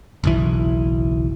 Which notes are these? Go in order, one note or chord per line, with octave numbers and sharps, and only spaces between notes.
F#1 B1 E3